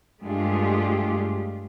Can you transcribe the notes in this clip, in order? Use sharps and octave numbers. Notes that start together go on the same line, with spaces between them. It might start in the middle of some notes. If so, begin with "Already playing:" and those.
G2 G#3 A3 F4 G4 G#4